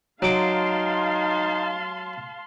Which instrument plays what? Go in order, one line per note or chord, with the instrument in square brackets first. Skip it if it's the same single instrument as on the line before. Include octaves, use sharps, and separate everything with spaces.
[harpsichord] F#3 D6 [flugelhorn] D#4 [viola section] F5 A5 C6